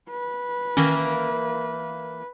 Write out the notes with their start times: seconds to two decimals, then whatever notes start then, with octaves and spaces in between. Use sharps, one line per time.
0.10 B4
0.77 D#3 E3 A#3 C#4 A#4